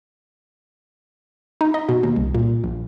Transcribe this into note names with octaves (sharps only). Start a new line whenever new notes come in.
D#4
D#5
B2
D#2
C2
A#2
A#1